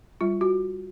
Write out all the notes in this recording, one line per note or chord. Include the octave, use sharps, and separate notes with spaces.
G3 F4
F#4